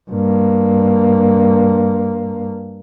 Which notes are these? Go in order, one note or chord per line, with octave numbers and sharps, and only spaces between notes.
G2 A#3